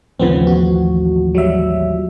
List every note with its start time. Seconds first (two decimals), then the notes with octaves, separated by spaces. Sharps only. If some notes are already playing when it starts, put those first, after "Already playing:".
0.19 A1 D#2 C#3 F3 B3 C4
0.47 F#4
1.35 F#3 G3 E5